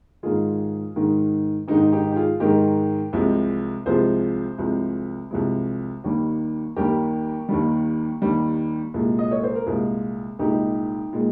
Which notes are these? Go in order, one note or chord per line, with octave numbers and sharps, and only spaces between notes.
G#2 D#3 G#3 F4 G#4
G#2 D#3 G#3
G#2 D#3 G#3 D#4 G4
D#4 G4
G4
F4 G#4
G#2 D#3 G#3 G4 A#4
C2 C3 F3 G#3
C2 C3 F3 G#3 G#4 C5
C2 C3 F3 G#3
C2 C3 F3 G#3
D#2 D#3 G3
D#2 D#3 G3 G4 A#4
D#2 D#3 G3
D#2 D#3 G3
C2 A#2 G#3
D#5
C#5
C5
A#4
C2 A#2 G#3 F4 G#4
C2 A#2 G#3 D#4 G4
A#2 G#3